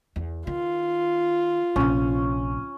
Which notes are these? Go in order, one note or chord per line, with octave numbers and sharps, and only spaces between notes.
E2
D#3 F4
A#1 C3 C#4